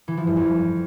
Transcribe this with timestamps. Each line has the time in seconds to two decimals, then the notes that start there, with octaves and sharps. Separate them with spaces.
0.08 E3
0.17 F3
0.27 G2
0.37 F2